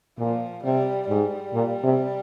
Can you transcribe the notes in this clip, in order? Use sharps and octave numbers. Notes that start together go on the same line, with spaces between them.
A#2 F3
C3 G3
G#2 G3
A#2
C3